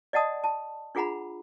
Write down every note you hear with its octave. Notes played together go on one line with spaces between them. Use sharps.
D5 D#5 F#5 A5 D#6
A5
D4 F4 G#4 F#5 A#5 B5